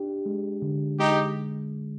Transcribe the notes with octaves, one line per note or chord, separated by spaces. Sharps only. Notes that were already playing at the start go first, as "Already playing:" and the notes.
Already playing: D4 G4
G#3
D3
G#3 D#4 G4